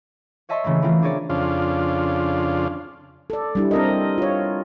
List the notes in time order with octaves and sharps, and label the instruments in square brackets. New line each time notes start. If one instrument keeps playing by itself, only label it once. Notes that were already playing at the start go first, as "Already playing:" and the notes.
[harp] C#5 D#5 E5 A5 C6 C#6
C#3 E3 A3 A#3
E3 F3 A3 A#3 C4 F4
D4 G#4 A#4 C#5 D5
[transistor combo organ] F2 C#3 D4 F4
[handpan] A4 D5
G3 D4 E4
C4 A#4 D#5
F4 C#5